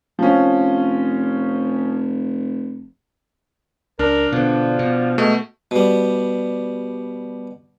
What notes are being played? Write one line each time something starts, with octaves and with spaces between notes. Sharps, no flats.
F1 F3 C#4
C#2 D4 A#4
B2 D3 F3
B2
B2 G#3 A3
B2 G3